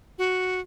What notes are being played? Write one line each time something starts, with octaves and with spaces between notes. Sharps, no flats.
F#4